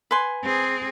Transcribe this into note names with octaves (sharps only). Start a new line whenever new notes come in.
B4 G#5 C6
C4 G#4